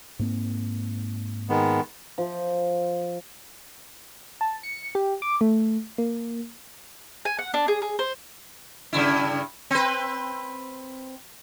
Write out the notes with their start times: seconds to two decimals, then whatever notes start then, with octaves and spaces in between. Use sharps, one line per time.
0.19 G#2 A#3 C4
1.49 D#3 G#3 B3
2.18 F3
4.41 A5
4.63 C#7
4.95 G4
5.22 D6
5.41 A3
5.98 A#3
7.25 G#5
7.38 F#5
7.54 D4
7.68 G#4
7.82 G#4
7.99 C5
8.93 G2 C#3 E4
9.71 C4 B4